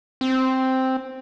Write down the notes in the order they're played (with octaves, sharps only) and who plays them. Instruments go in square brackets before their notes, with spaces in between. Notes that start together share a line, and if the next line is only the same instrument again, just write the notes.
[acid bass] C4